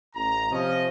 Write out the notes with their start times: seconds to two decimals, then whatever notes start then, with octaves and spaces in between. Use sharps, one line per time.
0.15 A1 A#5
0.52 C3 F3 C#4 D#5